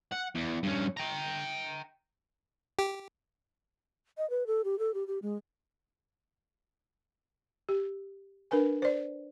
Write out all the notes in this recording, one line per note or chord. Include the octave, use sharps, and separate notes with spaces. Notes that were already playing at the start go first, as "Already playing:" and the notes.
F#5
E2
G2 C#4
G5 A#5
G4
D#5
B4
A4
G4
A4
G4
G4
G#3
G4
D4 A#4 B4 G#5
C5 D5